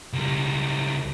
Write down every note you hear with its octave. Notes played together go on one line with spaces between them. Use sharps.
C#2 G3